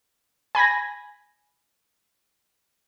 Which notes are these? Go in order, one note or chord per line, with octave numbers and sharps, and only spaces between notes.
G#5 B5 G#6 A#6